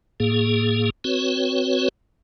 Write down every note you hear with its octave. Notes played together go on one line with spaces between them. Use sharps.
A2 A#3 G#4
C4 F#4 B4 C#5